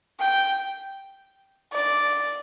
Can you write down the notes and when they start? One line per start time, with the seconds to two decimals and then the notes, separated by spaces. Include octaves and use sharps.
0.20 G5
1.73 D5